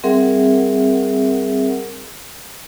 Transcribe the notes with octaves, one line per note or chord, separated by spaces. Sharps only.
G3 C4 G#4 A#4 E5 F#5